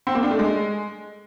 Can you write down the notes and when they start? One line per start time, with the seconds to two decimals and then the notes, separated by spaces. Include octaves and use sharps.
0.07 C4
0.15 A#3
0.23 D4
0.31 A3
0.39 G#3